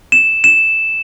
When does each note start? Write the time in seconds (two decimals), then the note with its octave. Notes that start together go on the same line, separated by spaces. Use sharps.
0.12 E7
0.44 E7